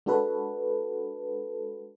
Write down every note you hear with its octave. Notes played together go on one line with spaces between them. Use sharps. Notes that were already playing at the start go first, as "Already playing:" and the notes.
G#3 D4 F#4 A4 B4